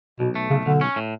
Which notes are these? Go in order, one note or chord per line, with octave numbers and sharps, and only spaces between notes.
B1 B2
A3
B1 C#3
B1 D3
C#4
A2